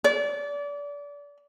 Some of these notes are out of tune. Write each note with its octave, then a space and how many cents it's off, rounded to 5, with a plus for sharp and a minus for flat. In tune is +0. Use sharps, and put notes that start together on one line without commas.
D5 -30